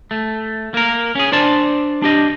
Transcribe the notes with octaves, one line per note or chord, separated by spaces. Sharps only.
A3
A#3 A#4
C#4 G#4
D4 C5 D5 A5
D4 G4 D#5